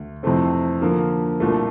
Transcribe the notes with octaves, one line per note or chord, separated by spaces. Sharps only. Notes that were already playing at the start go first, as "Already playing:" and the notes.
Already playing: D2
F2 C3 E3 A3 C4
D3 F3 A#3
C2 A#2 A3